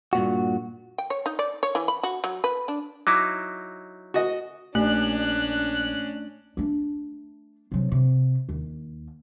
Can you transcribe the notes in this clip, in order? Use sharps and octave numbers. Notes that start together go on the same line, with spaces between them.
G2 A#2 F#4
G5
C#5
D#4
D5
C#5
E3
B5
F#4
F#3
B4
D4
F#3 D#4 E4 D6
F#4 D#5
A#1 A3 C#4 D4 F#6
A3 D4
C3 F#3
C3
D#2